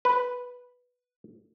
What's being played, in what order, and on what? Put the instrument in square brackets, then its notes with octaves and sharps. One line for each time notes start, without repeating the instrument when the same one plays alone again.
[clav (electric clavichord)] B4